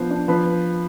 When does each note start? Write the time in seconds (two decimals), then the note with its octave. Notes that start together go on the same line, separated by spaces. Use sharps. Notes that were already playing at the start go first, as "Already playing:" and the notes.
Already playing: F3 B3 D4 C5
0.10 D4
0.28 F3 B4